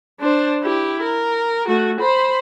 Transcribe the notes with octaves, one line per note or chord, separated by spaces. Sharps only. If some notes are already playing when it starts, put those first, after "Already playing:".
D4 C5
E4 G4
A#4
A3 F#4
C5 B5